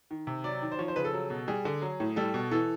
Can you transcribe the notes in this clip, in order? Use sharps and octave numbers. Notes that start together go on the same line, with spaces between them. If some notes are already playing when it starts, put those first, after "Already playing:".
D#3
C3
F#3 D5
D#3
C5
F3 C#5
C5
C#3 B4
A4
F#3
B2
G3 G#4
D3
F#3
A2
G3 A4
B2
E3 A4